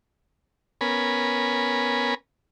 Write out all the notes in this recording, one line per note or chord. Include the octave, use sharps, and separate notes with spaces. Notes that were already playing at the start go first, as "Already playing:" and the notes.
B3 C#4 A#4 G#5 B5